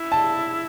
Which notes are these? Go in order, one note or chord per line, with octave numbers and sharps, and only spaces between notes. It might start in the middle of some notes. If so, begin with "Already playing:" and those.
Already playing: E4
A5